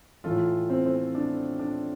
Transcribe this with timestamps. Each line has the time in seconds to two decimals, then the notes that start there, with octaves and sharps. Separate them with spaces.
0.24 A2 E3 A3 F4 A4
0.70 C4
0.86 C4
1.15 D4
1.59 D4